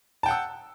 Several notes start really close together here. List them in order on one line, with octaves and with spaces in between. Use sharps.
A5 G5 F#5 E6